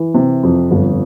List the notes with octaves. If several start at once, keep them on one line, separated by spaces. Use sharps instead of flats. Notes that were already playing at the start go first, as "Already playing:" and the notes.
Already playing: E3
C3
F2
G1